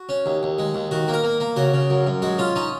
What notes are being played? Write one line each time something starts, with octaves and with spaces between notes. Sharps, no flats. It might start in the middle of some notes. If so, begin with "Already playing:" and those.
Already playing: F#4
C#4
D#2
D#2
G#3
D#2
D#3 F#4
A#3
A#4
A#3
A#3
C#3 F#4
C#3
F#2
F#2
G#3 F#4
C#4 F4
C#4 D#4